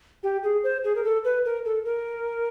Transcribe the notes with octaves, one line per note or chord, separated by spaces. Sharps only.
G4
G#4
C5
G#4
A#4
A4
B4
A#4
A4
A#4